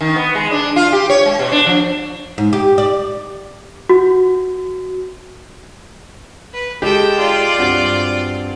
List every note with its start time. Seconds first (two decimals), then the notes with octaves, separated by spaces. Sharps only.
0.01 D#3
0.16 B3
0.35 G#3
0.51 D4
0.76 F4
0.93 G4
1.10 C#5
1.26 G#3
1.39 B2
1.52 D4
1.67 F3
2.38 G#2
2.53 G4
2.78 D5
3.89 F#4
6.53 B4
6.82 G#3 G4 A4 G5
7.19 F4 D5
7.59 G2 C4 F#4